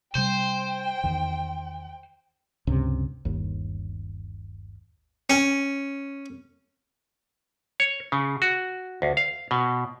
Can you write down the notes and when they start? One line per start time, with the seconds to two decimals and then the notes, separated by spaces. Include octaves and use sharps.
0.15 C3 G3 C5 G5
1.04 E2 D#3
2.67 C#2 G2 C3
3.25 G1 D#2
5.30 C#4
7.80 C#5
8.12 C#3
8.42 F#4
9.02 D2
9.17 F5
9.51 B2